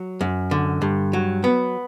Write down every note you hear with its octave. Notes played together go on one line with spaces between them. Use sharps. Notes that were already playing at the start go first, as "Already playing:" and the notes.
Already playing: F#3
F#2
D3
G2
F#3
B3